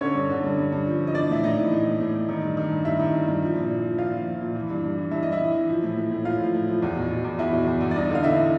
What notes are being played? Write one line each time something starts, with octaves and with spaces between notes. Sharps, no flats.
D3 C#4 C#5
G2
D3
G2
G2
G2
F3
F3
D#5
E3 D4 D5
A2 E5
A2 D#4 D#5
E3
A2
A2
A2
A2
D#3
G2
D#3
G2
G2 E4 E5
D#3
G2
G2
F3
A#2
A#2
F3
A#2 F4 F5
F3
F3
A#2
E3
G2
G2
E3
G2 E5
G2 D#5
E4 E5
E3
E3
F3
A2
A2
A2
A2 F4 F5
F3
A2
F3
E2
B2
B2
E2
E2 E4 E5
B2
E2
E2
D5
G2 D#4 D#5
D3
F5
D3 E4 E5